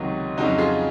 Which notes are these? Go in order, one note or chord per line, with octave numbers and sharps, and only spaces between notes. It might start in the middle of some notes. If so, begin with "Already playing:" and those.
Already playing: C#2 C3 D#3 F#3 D#4
F2 C#3 F#3 D#4 F#4
F4 G#4